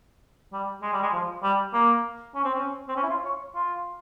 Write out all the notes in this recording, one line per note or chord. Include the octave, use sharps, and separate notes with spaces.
G3
G#3
G3
G#3
F3
G3
A#3
C#4
C4
C#4
C4
C#4
E4
F4
C#5
F4